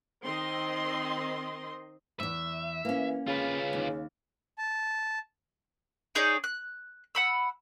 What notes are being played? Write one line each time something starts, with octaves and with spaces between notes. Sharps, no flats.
D#3 C4 D#5 C6
E2 G#2 E5
E3 A#3 C#4
C#3 F4 B4
D#2
A5
D#4 G#4 C#5 D5
F#6
F#5 B5 E6